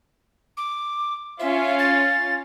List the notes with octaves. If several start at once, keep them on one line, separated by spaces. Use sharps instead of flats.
D6
C#4 F4 E5
A6